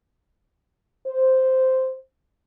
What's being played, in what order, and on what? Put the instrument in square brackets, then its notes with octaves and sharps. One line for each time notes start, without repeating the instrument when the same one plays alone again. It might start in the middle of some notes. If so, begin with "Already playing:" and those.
[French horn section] C5